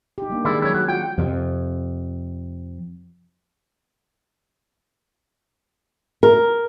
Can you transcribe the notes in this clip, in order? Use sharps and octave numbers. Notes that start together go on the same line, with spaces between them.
D#4 G4
G3 A#3 D4
D#3 G#3 E4 D5
F#3 C#4 E4 C#5
F#3 F#4
F4 F#4 F#5 G5
F2 C3
A#4